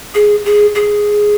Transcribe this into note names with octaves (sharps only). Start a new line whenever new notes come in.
G#4
G#4
G#4